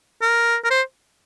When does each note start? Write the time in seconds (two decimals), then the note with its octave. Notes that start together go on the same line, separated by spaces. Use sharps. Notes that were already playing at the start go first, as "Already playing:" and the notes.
0.21 A#4
0.64 A#4
0.70 C5